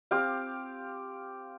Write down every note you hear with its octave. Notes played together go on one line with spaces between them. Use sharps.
C4 G4 F5